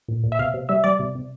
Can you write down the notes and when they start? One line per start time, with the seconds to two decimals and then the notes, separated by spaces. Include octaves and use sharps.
0.08 A#2
0.23 A#2
0.32 E5
0.39 C3 F5
0.54 C3
0.69 G3 E5
0.84 G3 D5
0.99 C3
1.15 C3